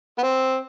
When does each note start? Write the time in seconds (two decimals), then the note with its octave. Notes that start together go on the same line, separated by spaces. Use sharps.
0.18 B3
0.23 C4